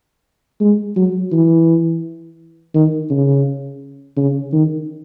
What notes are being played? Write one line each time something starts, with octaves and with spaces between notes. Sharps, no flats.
G#3
F#3
E3
D#3
C#3
C#3
D#3